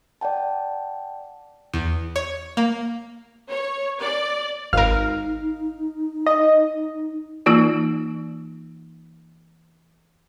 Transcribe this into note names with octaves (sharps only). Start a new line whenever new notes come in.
D5 F#5 G5 A5
E2
C#5
A#3
C#5
D5
G#1 D#4 A#4 F5
D#5
E3 A#3 D#4 F4 D5